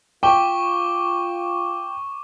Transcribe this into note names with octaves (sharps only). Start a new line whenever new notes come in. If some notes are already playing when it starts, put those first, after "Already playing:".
F4 G5 C#6 D6 G7